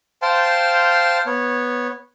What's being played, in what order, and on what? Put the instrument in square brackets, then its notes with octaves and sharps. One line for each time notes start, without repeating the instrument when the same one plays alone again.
[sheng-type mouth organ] C5 F5 G5 A5 C6
B3 C#5